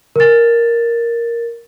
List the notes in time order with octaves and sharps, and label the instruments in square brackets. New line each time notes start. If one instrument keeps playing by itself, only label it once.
[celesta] A#4 A6